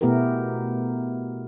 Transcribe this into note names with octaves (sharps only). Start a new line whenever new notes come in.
B2 A3 B3 E4 G4 A#4